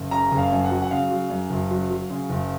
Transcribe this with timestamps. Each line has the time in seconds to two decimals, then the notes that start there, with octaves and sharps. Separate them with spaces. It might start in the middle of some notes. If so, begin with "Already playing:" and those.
Already playing: F#1
0.11 C#3 A#5
0.32 F#1
0.38 F5
0.52 F#2
0.64 F#5
0.71 F#3
0.82 F#5
0.91 C#3 F5
1.10 F#3
1.30 F#2
1.50 F#1
1.71 F#3
1.90 F#3
2.10 C#3
2.29 F#1